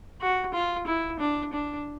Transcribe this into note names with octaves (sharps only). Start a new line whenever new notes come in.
F#4
F4
E4
D4
D4